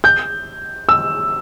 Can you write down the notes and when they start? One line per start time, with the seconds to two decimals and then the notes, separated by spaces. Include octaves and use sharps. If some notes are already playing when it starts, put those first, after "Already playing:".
0.04 G6
0.89 E6